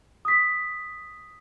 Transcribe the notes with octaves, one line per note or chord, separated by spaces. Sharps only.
D#6 B6